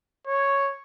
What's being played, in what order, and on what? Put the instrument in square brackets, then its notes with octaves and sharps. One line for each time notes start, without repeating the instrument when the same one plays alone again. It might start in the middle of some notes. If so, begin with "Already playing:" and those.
[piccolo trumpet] C#5